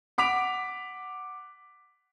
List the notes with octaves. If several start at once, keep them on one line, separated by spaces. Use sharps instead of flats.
F#5 D6 B6 D7 F7